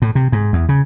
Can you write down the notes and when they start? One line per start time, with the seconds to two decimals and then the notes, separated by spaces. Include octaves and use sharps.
0.02 A2
0.15 C3
0.32 G#2
0.53 E2
0.69 C#3